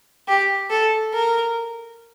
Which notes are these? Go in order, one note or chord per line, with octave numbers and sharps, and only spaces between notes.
G4
A4
A#4